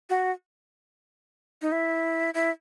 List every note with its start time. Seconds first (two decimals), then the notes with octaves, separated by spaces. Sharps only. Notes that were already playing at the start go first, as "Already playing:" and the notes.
0.10 F#4
1.62 D#4
1.72 E4
2.34 E4